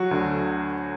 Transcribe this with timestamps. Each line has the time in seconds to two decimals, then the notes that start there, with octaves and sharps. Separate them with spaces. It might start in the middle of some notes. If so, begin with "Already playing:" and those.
Already playing: F#3 F#4
0.11 D2 D3